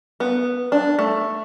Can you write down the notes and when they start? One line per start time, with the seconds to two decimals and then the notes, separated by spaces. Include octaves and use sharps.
0.20 B3
0.72 D4
0.99 A3